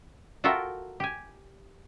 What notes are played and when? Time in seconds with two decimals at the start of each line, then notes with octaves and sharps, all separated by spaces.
0.44 F4 F#4 A4 A#4 E5 G5
1.00 G4 G#5